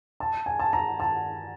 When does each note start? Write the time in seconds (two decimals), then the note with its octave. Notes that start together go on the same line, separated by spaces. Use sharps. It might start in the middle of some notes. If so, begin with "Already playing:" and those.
0.20 A5
0.46 G#5
0.59 A5
0.73 A#5
1.00 A5